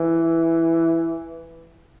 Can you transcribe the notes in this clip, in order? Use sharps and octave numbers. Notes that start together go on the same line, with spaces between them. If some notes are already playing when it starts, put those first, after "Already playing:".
Already playing: E3